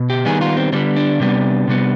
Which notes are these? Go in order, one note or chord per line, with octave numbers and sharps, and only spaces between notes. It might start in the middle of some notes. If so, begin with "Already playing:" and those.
Already playing: B2
G4
D#3 G3 B3 G#4
F4
C4
D3 G3 B3 C4
D4
C3 G3 B3
C3 G3 B3